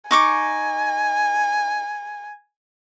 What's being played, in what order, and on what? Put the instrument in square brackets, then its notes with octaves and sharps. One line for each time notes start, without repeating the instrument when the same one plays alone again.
[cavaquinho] D#4 C#6 D6 [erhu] G#5